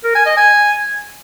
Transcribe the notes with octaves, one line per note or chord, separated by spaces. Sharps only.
A#4
G#5
D#5
G#5